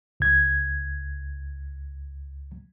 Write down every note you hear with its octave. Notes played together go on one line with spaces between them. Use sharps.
C#2 G#6